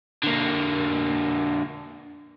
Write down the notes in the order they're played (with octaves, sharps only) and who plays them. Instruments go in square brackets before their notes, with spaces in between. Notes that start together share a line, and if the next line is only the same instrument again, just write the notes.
[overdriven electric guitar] D3 A#3